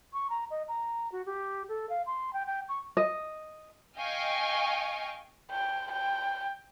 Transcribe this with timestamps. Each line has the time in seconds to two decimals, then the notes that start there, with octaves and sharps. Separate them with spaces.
0.13 C#6
0.30 A#5
0.51 D#5
0.68 A#5
1.12 F#4
1.26 G4
1.69 A4
1.89 F5
2.06 C6
2.33 G5
2.47 G5
2.69 C#6
2.97 D#5
3.99 D#5 F5 G5 G#5 C#6
5.51 G5
5.92 G5